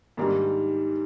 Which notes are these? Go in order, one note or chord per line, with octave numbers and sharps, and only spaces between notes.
G#2 D#3 G3 A#3 D4